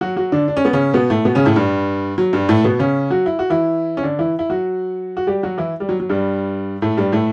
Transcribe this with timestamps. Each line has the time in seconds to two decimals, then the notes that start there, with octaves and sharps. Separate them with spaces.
0.01 F#3 F#4
0.16 F#3 F#4
0.32 D3 D4
0.48 D4
0.57 C#4
0.65 B3
0.73 C#3 C#4
0.94 B2 B3
1.10 A2 A3
1.25 B2 B3
1.35 C#3 C#4
1.45 A2 A3
1.56 G2 G3
2.18 F#3
2.33 G2 G3
2.49 A2 A3
2.64 B2 B3
2.79 C#3 C#4
3.10 F#3 F#4
3.26 E4
3.39 F#4
3.50 E3 E4
3.97 C#4
4.03 D3 D4
4.19 E3 E4
4.39 E4
4.50 F#3 F#4
5.17 F#4
5.27 G3 G4
5.43 F#3 F#4
5.58 E3 E4
5.80 G3
5.89 F#3
6.00 F#3
6.09 G2 G3
6.82 A2 A3
6.97 G2 G3
7.12 A2 A3